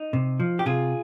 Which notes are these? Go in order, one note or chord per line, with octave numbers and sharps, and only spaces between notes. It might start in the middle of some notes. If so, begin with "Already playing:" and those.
Already playing: D#4
C3
F3
G4
C3 F4 G#4